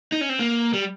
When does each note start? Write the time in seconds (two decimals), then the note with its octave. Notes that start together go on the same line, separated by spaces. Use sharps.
0.12 D#4
0.21 C#4
0.29 C4
0.39 A#3
0.73 G3